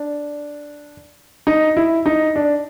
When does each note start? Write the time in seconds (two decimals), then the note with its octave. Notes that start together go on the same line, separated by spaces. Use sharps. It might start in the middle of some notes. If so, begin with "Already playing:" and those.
Already playing: D4
1.47 D#4
1.77 E4
2.06 D#4
2.36 D4